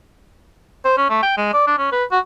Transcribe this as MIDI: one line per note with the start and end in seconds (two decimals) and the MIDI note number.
0.85 0.95 72
0.97 1.07 61
1.10 1.20 57
1.23 1.34 79
1.37 1.53 56
1.53 1.67 74
1.67 1.78 62
1.78 1.92 61
1.92 2.04 71
2.11 2.19 66